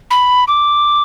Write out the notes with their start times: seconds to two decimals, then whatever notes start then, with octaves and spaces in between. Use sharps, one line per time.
0.10 B5
0.48 D6